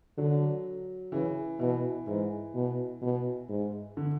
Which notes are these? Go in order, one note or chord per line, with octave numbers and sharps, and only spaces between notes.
D3 F#3
C#3 E3
B2 E3
G#2 E3
B2
B2
G#2
D3